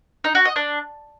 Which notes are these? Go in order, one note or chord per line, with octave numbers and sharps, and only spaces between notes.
D#4
F#4
D#5
D4